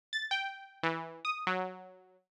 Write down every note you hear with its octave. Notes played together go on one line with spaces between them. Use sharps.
A6
G5
E3
D#6
F#3